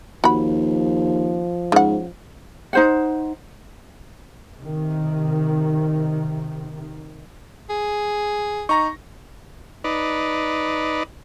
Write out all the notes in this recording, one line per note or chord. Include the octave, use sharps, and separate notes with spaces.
D#2 F3 F#4 B5
G#2 C#3 F#5
D#4 C5 F#5
C3 D#3
G#4
D#4 A#5 C#6 A#6
D#4 B4 D5